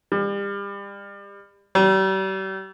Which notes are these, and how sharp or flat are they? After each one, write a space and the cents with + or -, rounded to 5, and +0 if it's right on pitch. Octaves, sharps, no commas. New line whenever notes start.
G3 +35
G3 -40